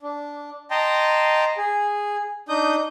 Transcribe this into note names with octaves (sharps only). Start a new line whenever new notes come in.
D4
D#5 G5 A5 A#5 C6
G#4
D4 D#4 D#6 G6